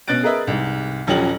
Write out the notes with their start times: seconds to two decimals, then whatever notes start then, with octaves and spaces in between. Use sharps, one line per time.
0.08 B2 C#4 F#6 A6 D7
0.23 G#4 A#4 B4 D#5 E5
0.47 C2 G#2
1.07 D#1 F3 F#3 C#4 G4 F#7